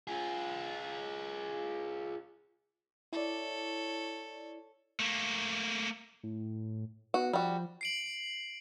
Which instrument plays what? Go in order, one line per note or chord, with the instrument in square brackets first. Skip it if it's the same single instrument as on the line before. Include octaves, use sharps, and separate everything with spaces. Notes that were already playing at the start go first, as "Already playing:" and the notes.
[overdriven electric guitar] F4 G#4
[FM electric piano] E4 D5 [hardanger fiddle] A4 C#5
[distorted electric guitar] A3 A#3
[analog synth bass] A2
[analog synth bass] B3 [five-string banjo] F#4
[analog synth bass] F3 [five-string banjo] G3 F#4
[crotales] C7 D7 F#7